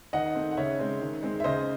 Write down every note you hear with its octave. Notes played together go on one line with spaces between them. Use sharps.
D#3 D#5 F#5
A3 C4
F#5
C#3 C#5 E5
G#3 C4
D#3
G#3 C4
E5
C#3 C5 D#5